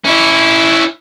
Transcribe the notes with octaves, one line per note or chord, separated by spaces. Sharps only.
C#4 E4